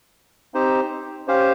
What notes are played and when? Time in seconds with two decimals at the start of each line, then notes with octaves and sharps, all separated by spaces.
0.54 C4 D#4 G4 C5
1.27 C#4 G4 C5 F5